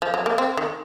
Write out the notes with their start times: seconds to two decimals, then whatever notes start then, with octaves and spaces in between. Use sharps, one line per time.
0.02 F3
0.14 F#3
0.26 A#3
0.38 C4
0.57 D#3